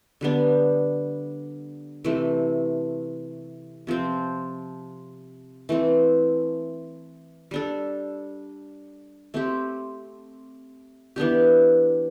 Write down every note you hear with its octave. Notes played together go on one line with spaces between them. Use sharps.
D3 G3 B3 D4
C3 E3 A3
C3 F3 C4
E3 A3 C4
G3 D4 A4
A3 C4 G4
E3 B3 D4 G4